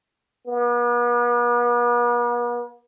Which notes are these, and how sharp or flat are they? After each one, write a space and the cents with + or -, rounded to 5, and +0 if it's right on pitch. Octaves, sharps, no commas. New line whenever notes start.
B3 -45